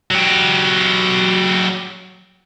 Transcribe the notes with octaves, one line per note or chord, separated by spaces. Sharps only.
F#3 G4